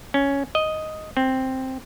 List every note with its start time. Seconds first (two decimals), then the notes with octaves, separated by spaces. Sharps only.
0.14 C#4
0.55 D#5
1.17 C4